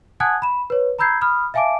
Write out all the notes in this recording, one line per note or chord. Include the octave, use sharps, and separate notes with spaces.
F#5 G#5 A5 D#6 F#6 G#6
B5 E7
B4 C#5
A#5 B5 E6 G6 G#6 C7
B5 D#6 F6
E5 F5 G#5 A5 D6 D7